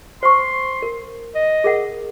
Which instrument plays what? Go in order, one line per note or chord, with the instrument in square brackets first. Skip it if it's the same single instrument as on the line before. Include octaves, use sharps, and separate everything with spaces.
[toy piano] C5 C#6 [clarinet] C6
[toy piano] A#4
[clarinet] D#5
[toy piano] G#4 A#4 F#5